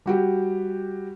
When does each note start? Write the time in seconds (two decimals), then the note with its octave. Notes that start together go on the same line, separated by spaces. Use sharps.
0.06 G3 F#4 G4